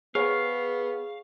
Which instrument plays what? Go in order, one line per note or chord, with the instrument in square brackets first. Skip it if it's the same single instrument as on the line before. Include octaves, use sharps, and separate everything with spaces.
[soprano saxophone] B3 [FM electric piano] G#4 [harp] C#5 C#6 [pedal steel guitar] F5